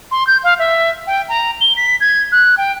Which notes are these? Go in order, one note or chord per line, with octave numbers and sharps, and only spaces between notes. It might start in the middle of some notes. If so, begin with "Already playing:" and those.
C6
G6
F5
E5
G5
A#5
G7
B6
G#6
F#6
G5